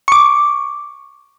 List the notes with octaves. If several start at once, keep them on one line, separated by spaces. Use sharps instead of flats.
C#6 D6